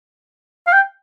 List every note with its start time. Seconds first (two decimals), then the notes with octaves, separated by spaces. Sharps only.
0.67 F5
0.73 G5